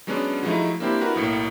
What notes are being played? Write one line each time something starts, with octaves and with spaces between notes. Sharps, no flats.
F#3 G#3 B3 C#4 D4
F3 F#3 G#3 A3 D#4 E4
A#3 C4 D4 E4 G4 C5
D4 E4 F#4 A#4 B4
B1 A2 A#3 C#7